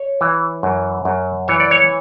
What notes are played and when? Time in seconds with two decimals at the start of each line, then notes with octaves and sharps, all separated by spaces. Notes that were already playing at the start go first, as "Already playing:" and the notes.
Already playing: C#5
0.21 E3
0.63 F#2
1.05 F#2
1.48 E3 C#5
1.60 D5
1.71 C#5